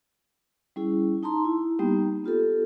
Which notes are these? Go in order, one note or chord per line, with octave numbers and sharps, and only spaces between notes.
G3 C#4 E4 G#4
D#4 A5 A#5 C6
E4
G3 A#3 B3 D#4 G4
B3 F4 G4 A4